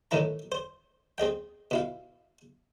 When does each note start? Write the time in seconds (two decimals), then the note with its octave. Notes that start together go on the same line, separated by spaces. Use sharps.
0.11 A2 D#3 E3 E4 A#5
0.52 C5
1.18 C4 G#4 D#5 G5
1.71 B2 E4 F5